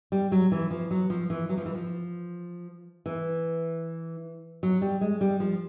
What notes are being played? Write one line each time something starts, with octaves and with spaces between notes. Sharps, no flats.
G3
F#3
E3
F3
F#3
F3
E3
F#3
F3
E3
F3
E3
F#3
G3
G#3
G3
F3